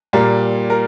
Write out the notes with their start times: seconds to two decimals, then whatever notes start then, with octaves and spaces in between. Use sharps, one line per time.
0.13 A#2 G3 A#3
0.70 A#4